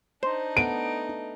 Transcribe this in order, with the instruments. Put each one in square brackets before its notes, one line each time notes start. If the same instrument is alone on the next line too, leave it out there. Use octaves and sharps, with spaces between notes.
[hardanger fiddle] D4 D#4 [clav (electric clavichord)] C5
[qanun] A3 B3 [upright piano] D7